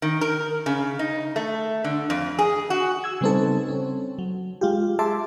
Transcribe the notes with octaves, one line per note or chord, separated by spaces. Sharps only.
D#3
A#4
C#3
D#4
A3
D3
F2
G#4
F#4
E6 G#6
C#3 G3 B3 C4 D#4 A4
C4 C#4
F#3
G#3 F4 G4
G#4 E5 A5 C6 D6